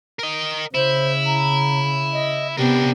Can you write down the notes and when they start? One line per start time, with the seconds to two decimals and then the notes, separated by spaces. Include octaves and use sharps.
0.19 A#4 D#5
0.74 C#3 E4 C5
1.26 A#5
2.13 D#5
2.58 C3 B3 D4 G4 A#4